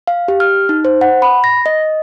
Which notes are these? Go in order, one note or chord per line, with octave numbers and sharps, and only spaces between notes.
F5
G4
F6
D#4
C5
F#5
B5
A#6
D#5